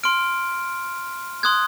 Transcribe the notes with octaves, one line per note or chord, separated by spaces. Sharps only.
C6 F6 D7
C6 D#6 F#6 G#6